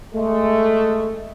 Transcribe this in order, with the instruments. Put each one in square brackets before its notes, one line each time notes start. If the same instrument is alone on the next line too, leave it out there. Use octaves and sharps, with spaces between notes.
[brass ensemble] G#3 A3